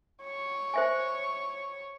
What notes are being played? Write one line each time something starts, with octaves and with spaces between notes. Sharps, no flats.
C#5
C5 E5 G#5